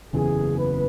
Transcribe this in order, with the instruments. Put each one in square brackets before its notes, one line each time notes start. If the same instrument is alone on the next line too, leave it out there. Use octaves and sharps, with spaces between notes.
[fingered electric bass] F#1 E2 C#3 E3 [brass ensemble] G#4
[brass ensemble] B4